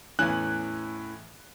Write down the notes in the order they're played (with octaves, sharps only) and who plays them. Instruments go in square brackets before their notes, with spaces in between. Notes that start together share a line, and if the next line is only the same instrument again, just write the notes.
[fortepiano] E2 G#5 [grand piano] A2 E3 C#4 [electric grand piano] F#6